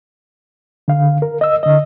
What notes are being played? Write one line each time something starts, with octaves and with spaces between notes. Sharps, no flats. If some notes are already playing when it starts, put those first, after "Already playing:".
D3 F5
A#4
D#5 E6
D3 D#5